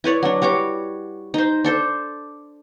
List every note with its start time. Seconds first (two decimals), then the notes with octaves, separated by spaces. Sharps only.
0.04 E4 B4 C#5 D5
0.23 F#3 D4
0.42 G3 F#4 C#5 D6
1.34 D#4 C5
1.64 D4 A4 C5